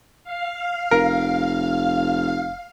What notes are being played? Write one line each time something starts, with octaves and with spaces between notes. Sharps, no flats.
F5
F1 A#4